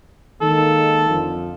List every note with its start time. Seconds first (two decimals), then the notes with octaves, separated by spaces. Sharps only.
0.41 D#3 G#3 A#3 A4
1.10 F2 D3 F3